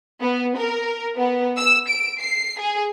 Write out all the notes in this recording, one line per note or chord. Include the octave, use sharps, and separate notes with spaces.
B3
A#4
B3
E6
D7
C7
G#4